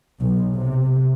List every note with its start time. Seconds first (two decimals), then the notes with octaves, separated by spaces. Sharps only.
0.20 B1
0.54 C3